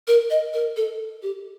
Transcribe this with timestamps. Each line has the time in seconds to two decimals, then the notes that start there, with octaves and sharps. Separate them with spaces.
0.08 A#4
0.30 D#5
0.53 A#4
0.77 A4
1.23 G4